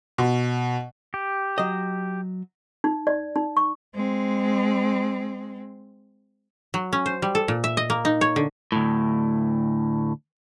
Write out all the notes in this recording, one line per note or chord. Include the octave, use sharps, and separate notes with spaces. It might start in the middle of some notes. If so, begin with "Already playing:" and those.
B2
G4
F#3 D#5
D#4
D5
D#4
C#6
G#3 C4
F#3
C#4
C5
G3
A4
A#2
E5
D#5
A#3
D#4
C#5
D3
D2 A2